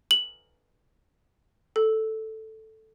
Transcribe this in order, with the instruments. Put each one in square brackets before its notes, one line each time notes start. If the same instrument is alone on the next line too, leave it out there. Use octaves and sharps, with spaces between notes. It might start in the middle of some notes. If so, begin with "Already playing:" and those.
[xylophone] F#7
A4